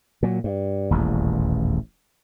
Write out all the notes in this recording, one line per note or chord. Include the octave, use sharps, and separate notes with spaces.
A#2 F#3
G2
D#1 A1 E2